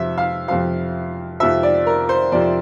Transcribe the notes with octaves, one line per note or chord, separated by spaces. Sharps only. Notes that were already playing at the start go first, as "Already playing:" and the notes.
Already playing: F2 C3 F3 E5
F5
F2 C3 F3 F5
F2 C3 F3 E5
D5
A#4
C5
F2 C3 F3 D5